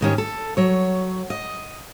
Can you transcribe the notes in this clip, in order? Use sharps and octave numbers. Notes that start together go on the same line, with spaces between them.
G#2 D#3 C#4 G4
A4
F#3 C#5
D#5